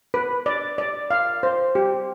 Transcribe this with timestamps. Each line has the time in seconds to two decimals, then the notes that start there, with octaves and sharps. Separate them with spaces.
0.14 B4
0.46 D5
0.78 D5
1.11 F5
1.43 C5
1.75 G4